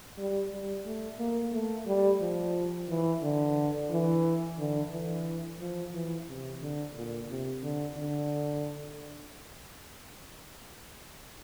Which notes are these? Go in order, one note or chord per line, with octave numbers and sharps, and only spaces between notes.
G3
G3
A3
A#3
A3
G3
F3
E3
D3
E3
D3
E3
F3
E3
C3
D3
A#2
C3
D3
D3